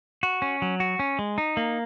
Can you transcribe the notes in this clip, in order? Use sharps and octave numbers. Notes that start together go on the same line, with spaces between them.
F#4
C#4
F#3
F#4
C#4
G#3
D#4
A#3